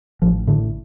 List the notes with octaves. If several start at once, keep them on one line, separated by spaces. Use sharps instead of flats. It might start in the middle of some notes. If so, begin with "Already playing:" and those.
A1 F3
A2 D3